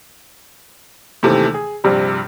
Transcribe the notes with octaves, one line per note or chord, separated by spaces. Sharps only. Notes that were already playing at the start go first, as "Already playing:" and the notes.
D#2 C3 D#3 E3 A3
G#4
A#1 G2 C3 G3